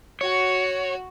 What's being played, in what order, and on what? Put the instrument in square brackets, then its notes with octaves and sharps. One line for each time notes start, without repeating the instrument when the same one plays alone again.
[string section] F#4 [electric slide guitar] C#5